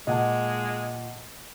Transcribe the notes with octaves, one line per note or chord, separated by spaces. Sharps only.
A#2 G#3 D#5 F#5 A5